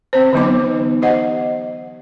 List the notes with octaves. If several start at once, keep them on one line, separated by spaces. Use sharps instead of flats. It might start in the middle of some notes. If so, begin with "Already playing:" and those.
C4 C5
D3 E3 F#3 B3 D#4 D6
G4 C5 D#5 F#5